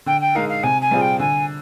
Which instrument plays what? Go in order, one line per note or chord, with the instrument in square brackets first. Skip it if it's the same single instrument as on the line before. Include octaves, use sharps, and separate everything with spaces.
[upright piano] D3 [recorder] G5
[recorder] G5
[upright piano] G#3 D#4 A#4 [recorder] F5
[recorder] F5
[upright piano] C3 [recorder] G#5
[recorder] G#5
[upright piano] G3 C4 F4 G#4
[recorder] G5
[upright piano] D3 [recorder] G#5